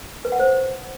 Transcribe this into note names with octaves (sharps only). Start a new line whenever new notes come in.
B4
F#5
C5